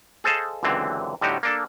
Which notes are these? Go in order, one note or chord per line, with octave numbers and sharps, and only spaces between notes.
G#4 A4 C5 D#5 F5 A5
C#2 F#2 D3 E3 C4
A2 D3 G3 D#4 F#4 G4
A#3 D4 A4